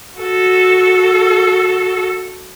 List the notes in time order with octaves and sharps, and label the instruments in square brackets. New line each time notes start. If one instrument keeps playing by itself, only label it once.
[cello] F#4 A4